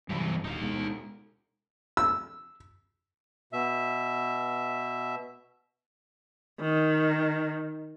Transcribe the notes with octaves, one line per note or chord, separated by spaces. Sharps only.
G2 C3 E3 F#3 G3
D1 D#4 F5
B2 G#3
E6
B2 E5
D#3